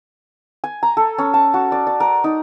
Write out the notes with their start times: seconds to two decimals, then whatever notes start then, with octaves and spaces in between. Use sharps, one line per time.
0.64 G#5
0.83 A#5
0.97 A4
1.18 C#4
1.34 A5
1.54 F#4
1.72 D5
1.87 D5
2.00 A#4
2.24 D#4